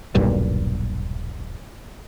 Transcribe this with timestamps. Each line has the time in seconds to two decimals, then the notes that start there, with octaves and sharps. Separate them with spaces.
0.15 D#1 B1 G2 A#2